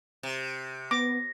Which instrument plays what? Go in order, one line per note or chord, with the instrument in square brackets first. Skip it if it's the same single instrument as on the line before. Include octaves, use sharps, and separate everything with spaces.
[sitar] C3
[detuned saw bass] B3 [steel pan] D6 [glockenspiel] A#6